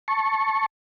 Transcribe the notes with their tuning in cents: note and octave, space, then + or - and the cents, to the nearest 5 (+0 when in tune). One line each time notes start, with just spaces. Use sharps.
A5 +0 C#6 -15